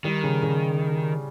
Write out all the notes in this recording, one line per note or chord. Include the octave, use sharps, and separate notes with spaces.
D#3 G3
C#3
C#3